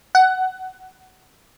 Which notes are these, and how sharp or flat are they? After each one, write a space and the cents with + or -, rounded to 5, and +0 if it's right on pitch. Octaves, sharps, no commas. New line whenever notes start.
F#5 +15